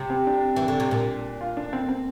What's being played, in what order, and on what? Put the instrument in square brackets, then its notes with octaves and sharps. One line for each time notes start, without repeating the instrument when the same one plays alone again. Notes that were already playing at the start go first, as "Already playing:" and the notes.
Already playing: [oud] C3
[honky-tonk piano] C4
D4
[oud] E3
D3
C3
A#2
[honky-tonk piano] F4
D4
C4
C4